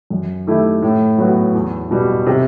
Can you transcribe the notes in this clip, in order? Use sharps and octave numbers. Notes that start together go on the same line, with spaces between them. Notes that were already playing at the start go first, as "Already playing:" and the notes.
F#2
D#3 A3 E4 G4
A2
F#3 B3 F#4
E2
B2 G3
C3